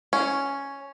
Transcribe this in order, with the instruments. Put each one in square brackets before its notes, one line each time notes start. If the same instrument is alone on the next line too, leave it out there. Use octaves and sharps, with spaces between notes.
[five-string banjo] C#4